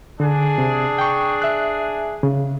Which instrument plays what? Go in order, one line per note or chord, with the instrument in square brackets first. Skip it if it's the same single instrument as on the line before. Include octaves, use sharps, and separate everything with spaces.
[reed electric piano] D3 [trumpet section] D4 G#4
[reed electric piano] C3
G5 C#6
E5 F#6
C#3